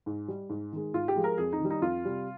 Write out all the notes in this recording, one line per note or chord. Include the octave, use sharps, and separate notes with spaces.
G#2
G3
G#2
D#3 G#3
G#2 F4
G4
F3 G#3
A#4
F2 G#4
D#4
D#3 G3
D#4
F2 F4
C3 G3